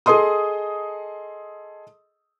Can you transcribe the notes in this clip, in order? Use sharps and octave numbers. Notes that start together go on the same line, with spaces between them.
G#4 A4 D#5 C6 D#6